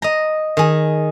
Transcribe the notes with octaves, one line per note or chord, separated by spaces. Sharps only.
D#5 A#5
D#3 G#4